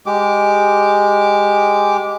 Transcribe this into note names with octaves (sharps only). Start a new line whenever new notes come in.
G#3 G4 D6